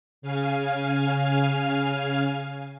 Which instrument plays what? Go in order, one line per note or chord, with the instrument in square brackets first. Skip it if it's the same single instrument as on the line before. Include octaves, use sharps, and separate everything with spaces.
[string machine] C#3 F5 G#5 F6